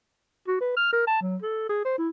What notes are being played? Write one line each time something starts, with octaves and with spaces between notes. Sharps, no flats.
F#4
B4
F6
A#4
A5
F#3
A4
G#4
C5
E4